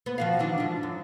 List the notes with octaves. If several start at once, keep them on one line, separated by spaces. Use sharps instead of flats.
B3
F3 F#4 F5
D#3 E3 D4
G#2 F3 D4
F#2